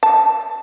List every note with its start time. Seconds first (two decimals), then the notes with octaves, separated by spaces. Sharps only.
0.03 A5